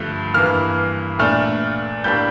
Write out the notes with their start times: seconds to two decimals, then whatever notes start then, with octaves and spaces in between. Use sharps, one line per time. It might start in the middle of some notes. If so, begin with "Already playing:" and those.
Already playing: G2 D3 F3 A3
0.34 G2 E3 A#3 F6
1.19 A#2 A3 D4 F6
2.04 A2 G3 A#3 D4 G6